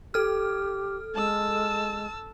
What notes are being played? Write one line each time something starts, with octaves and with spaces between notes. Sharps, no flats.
G4 A4 F6
G#3 A5 E6